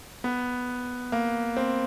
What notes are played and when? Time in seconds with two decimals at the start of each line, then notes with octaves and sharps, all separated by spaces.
0.24 B3
1.12 A#3
1.57 C4